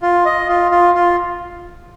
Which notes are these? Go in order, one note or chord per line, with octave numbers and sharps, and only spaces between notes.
F4
D#5
F4
F4
F4